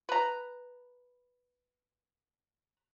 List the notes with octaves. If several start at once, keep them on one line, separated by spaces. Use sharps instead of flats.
B4 A#5